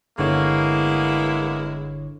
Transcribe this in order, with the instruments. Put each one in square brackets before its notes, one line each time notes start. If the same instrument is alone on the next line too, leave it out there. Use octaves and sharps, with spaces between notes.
[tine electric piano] G1 D3 C#5 [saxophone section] G#3 B3 E4 [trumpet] A#3